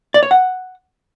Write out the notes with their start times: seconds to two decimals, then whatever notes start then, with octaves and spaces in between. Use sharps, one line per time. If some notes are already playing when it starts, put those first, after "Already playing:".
0.14 D5
0.23 C#5
0.31 F#5